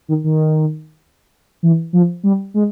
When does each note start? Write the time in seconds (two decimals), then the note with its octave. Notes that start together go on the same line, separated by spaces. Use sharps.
0.08 D#3
0.24 D#3
1.63 E3
1.93 F3
2.23 G3
2.54 G#3